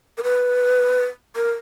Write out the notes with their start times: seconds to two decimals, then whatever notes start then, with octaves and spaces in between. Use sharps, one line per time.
0.18 A#4
0.23 B4
1.36 A#4